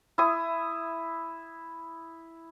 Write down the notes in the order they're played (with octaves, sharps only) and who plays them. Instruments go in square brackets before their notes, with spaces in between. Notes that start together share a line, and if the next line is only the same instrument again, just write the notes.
[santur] E4 D#6